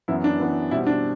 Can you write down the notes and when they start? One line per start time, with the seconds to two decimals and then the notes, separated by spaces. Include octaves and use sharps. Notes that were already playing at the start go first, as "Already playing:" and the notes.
0.08 F#2 E3 B3 E4
0.24 D4
0.39 F#2 E3 B3
0.71 B2 G3 C4 E4
0.87 D4